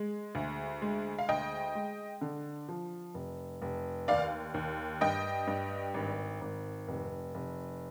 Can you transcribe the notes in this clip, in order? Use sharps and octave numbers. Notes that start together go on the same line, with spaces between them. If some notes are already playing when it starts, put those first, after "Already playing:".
Already playing: G#3
D2
G#3
F5
D2 D#5 G5
G#3
D3
F3
F1
F1
D#2 D5 F5
D#2
G2 D#5 G5
G2
G#1
G#1
F1
F1